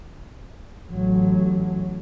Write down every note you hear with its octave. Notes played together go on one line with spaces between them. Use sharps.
A1 F#3